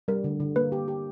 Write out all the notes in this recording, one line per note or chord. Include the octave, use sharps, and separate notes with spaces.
G3 A#4
D3
D3
A#3 B4
G4
G4